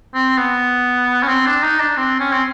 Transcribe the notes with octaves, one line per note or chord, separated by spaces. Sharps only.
C4
B3
C#4
C4
D4
D#4
D4
C4
C#4
C4